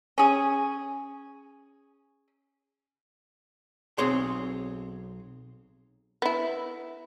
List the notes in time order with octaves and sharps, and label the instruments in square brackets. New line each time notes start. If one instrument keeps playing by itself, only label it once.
[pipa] C#4 G#4
[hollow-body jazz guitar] B1 C4 G#4 C#5 C6
[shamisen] B3 E4